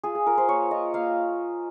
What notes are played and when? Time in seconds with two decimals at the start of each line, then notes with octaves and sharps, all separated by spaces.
0.04 F4 G#4
0.15 G#4
0.26 F4 A#4
0.38 C5
0.48 A#3 C#5
0.71 F4 D#5
0.94 A#3 F5